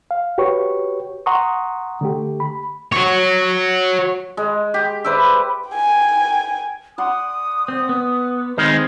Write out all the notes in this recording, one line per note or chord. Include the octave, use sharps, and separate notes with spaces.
F5
F#4 G4 B4 C#5 C#6
F#5 A#5 C6 C#6 D#6
D3 A3 G4
B5
F#4 C#5
G#3
G4
B4 C5 D5 E5
G5 G#5
D5 F#5 C6 D#6
C4
B3
D#3 G#3 C4 B4 C6